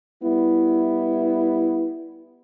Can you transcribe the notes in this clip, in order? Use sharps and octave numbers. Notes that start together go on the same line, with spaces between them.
G3 B3 E4